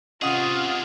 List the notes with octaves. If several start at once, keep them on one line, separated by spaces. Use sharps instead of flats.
C3 C#4 F4 G#4 D#5 F#5 D#6